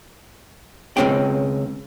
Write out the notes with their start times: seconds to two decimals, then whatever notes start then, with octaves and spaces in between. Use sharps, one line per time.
0.97 C#2 D#3 C4 C#4 G#4 G5